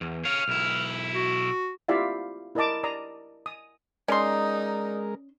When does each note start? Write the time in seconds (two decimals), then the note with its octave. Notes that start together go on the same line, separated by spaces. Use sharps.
0.01 E2
0.25 C#5 F5 F6
0.48 B1 E4
1.15 F#4
1.88 E4 F4 G4 D5 E5 F5
2.55 E4 A#4 D5 D#5 A5 D6
2.83 D5 A#5 D#6
3.46 D#6
4.08 G#3 C#4 D#4 A#4 D5 C6 D#6